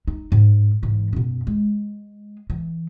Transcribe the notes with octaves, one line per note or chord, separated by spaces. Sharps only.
D#4
G#2
G#2 E3
F#2 B2
G#3
E3